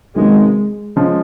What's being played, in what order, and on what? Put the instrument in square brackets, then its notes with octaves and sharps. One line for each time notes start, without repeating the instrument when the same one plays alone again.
[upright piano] C3 D#3 F#3 B3 D#4 [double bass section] G#3
[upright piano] F3 G#3 C#4 F4